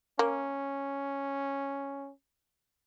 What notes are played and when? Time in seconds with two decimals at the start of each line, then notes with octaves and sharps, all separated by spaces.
0.19 A#3 C#4